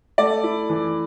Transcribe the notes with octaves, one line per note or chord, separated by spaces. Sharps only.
A3 D5
E4
E3